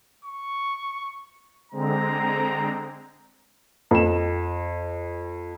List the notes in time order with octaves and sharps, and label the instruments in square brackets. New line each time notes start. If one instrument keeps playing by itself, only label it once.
[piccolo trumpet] C#6
[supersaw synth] D3 G#3 C4 [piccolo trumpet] A#5
[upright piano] F2 E7